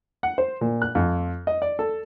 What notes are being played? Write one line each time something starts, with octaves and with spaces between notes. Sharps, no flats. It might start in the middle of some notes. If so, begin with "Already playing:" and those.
F#5
C5
A#2
F#6
F2
D#5
D5
A4